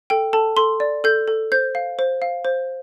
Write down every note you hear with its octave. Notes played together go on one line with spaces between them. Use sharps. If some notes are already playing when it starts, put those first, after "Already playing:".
A4 G5
A4 A5
A4 C6
D5
A4 G6
A4
C5 G6
F5
C5
F5
C5